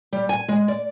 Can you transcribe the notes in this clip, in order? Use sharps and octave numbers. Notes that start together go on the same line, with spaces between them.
G3
G#5
G#3
D5